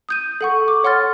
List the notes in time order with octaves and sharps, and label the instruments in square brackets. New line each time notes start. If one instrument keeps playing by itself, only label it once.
[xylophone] D#6 G6 D#7
A4 F#5 C#6
D6
C#5 F#5 C6 F6 A6